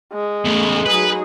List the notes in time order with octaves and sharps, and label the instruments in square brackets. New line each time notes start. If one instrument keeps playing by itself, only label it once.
[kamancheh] G#3
[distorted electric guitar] E2 C#3 [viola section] A3
[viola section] F#3 D#4 G#4 [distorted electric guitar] B4